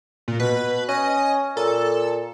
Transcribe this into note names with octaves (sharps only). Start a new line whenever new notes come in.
A#2
B2 B4
C#4 D#5
A#2 A4